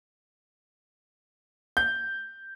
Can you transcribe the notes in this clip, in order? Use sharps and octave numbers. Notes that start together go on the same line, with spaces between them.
G6